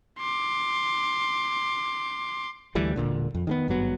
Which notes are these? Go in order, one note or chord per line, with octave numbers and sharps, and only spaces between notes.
C6 D6
D2 E3 G3 A3
E1 F2 A#2 D3
F2
D#3 G#3 B3
G#1 G2 F#3 B3